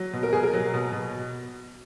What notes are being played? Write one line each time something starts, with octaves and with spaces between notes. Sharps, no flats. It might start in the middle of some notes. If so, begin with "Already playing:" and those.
Already playing: F#3
B2
A#4
B2 G#4
A#4
F#3
B2
B2